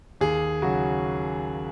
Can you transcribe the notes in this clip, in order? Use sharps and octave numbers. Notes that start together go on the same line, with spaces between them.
D#2 G#4
C#3 F#3 F#4